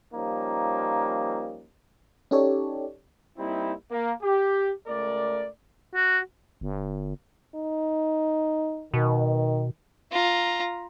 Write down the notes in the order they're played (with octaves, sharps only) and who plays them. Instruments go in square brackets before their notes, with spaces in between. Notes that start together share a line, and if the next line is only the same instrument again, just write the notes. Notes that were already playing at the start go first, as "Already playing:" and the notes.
[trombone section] F3 G3 A#3 C#4 D#4
[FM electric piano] C#4 D#4 G4 A4 C#5 D5
[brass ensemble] G3 A#3 C4 D#4 E4
A#3
G4
C#2 A3 A#4 D5
[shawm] F#4
[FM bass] G1
[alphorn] D#4
[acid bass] B2 [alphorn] D#3
[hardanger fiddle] F4 A#5